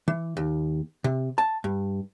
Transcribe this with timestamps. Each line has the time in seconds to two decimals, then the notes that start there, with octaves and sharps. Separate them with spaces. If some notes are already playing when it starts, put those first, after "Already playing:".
0.08 E3
0.37 D#2
1.04 C3
1.38 A5
1.64 G2